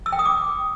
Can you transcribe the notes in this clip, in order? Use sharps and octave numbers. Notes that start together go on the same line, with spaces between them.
E6
G5
D#6
D6